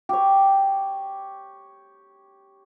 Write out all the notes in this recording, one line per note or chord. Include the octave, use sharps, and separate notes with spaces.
G4 C#5